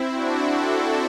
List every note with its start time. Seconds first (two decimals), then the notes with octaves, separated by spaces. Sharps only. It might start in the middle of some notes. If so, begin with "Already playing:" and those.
Already playing: C4 E4
0.15 D4 F#4
0.49 F#4 A4